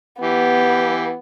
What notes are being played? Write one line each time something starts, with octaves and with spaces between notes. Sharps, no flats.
E3 B3 G4